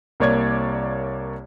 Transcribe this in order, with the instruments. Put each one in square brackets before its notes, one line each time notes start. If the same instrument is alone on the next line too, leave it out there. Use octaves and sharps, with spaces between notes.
[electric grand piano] C2 A#3 C#5 D5 G#6